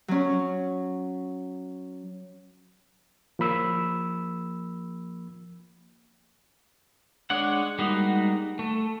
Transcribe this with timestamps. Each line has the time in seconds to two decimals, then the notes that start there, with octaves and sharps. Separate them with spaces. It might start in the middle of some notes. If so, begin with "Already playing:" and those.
0.08 F#3 C#4
3.39 F3 A#3 B5 E6
7.30 G#3 D4 C#5 F#5
7.79 G3 G#3 A#3 D#4 F#4
8.59 A3